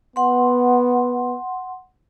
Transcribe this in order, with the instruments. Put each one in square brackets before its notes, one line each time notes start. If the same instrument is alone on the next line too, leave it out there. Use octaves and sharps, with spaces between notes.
[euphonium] B3 [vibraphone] F#5 C6